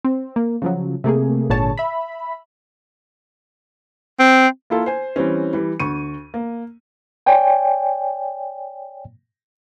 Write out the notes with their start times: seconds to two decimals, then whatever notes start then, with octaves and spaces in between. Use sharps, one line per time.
0.05 C4
0.36 A#3
0.62 C#3 F3 F#3
1.04 C3 A3 A#3 G#4
1.49 G#1 A#2 D3 G#4 C#5 A5
1.78 E5 B5
4.19 C4
4.70 A#3 E4 F4 A4
4.86 C5 G#5
5.16 E3 G3 C4 C#4
5.53 E3 G3
5.80 D2 C#6 D#7
6.34 A#3
7.26 C#5 D5 G5 G#5